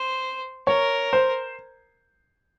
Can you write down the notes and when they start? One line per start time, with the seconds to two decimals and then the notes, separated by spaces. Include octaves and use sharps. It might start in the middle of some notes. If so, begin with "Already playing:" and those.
Already playing: C5
0.67 A#4 C#5
1.13 C5